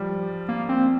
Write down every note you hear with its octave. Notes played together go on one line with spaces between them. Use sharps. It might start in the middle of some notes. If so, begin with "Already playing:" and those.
Already playing: F3 G3
A#3
C4